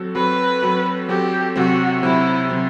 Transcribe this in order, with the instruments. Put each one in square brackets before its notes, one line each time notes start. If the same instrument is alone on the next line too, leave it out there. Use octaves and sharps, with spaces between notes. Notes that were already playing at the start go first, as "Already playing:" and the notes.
Already playing: [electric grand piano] F#3 C4 F#4 A4
[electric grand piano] F#3 C4 F#4 A4 [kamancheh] B4
[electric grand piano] F#3 C4 F#4 A4
[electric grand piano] F#3 C4 F#4 A4 [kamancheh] G4
[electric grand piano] C3 F#3 C4 [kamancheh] F#4
[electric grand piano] C3 F#3 C4 [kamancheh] E4
[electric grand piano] C3 F#3 C4